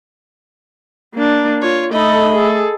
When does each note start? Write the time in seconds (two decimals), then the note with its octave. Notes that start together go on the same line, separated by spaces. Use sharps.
1.14 A#3 D4
1.61 F4 C#5
1.92 A3 D#4 A4 D#5 B5
2.32 G#4 A4